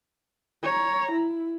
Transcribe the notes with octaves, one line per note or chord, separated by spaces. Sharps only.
C#5 A#5
E4